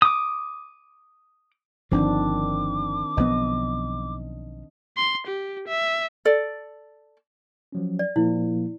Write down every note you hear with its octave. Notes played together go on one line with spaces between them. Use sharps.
D6 D#6
G1 D#3 F3 C4 D4 D6
B1 F3 B3 D#5
C6
G4
E5
A4 D5
F3 F#3 C#4
D5
A#2 F3 A#3 E4